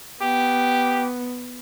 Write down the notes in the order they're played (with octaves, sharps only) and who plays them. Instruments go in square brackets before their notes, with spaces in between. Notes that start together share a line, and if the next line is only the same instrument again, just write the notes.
[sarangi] B3 [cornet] G4